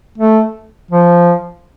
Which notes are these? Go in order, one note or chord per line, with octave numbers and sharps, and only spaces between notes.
A3
F3